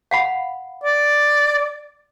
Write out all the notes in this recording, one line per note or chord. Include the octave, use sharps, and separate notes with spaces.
F5 F#5 B5
D5